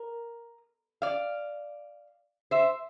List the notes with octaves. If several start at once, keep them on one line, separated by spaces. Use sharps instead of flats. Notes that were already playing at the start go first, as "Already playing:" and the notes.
Already playing: A#4
D5 F5
C5 E5